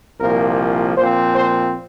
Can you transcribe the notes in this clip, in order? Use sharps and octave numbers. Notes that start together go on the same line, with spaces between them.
C2 A#2 F3 A#3 A#4
A#2 F3 C4 C5
C5